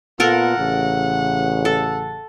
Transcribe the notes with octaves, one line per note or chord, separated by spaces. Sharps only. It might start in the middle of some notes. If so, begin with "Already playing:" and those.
A#2 B3 F4 A4 A#4 F#5
A1 C#3
A4